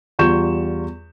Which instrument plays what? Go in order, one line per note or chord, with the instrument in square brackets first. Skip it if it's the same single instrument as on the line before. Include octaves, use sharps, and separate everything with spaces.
[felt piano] E2 G3 F4 C#6 G6 E7